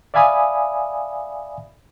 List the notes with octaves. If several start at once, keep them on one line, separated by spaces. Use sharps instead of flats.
D5 E5 F5 G#5 B5 D#6